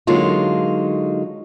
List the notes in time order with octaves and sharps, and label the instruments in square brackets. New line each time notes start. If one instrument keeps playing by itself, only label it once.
[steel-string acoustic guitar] D3 F#3 G#3 A#3 D#4 F4